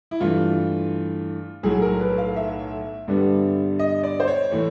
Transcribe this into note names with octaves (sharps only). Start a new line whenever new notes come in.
E4
G2 E3 A3 F4
B1 A2 F#3 G#4
A#4
B4
F5
E5
G2 D3 G3 B3
D#5
D5
C5
C#5
A2 E3 A3